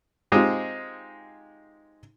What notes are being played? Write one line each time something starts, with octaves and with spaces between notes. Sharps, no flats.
G#3 C4 D#4 F4 G4 G#4